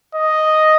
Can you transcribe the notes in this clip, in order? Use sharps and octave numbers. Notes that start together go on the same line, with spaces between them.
D#5